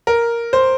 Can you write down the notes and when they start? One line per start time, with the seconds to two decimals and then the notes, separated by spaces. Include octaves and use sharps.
0.07 A#4
0.53 C5